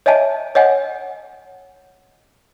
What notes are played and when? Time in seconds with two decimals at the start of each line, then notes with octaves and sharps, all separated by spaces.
0.06 C#5 D#5 E5 G#5 A5
0.55 C#5 D#5 F#5 G#5